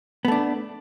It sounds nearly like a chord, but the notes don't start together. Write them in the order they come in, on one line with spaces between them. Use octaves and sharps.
B3 A3 D4